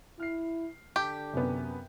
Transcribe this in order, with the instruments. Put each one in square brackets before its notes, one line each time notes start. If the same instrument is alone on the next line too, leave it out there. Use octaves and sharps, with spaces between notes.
[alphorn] E4 [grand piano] F6 C7
[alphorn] D3 [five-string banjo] G4 [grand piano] A5 G6 B6
[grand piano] F#2 [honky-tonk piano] C3 B3